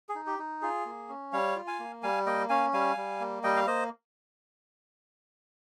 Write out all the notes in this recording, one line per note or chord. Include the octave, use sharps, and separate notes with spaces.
G#4
D#4
G4
D#4
F4 G#4
A#3
C#4
G3 C#5 F5
F4
F5 G#5
A#3
G3 F5 G#5
A#3 D#5 G5
C#4 F5 G#5
G3 F5 G#5
G3
A#3
G3 D#5 G5
F5
A#3 C5 D#5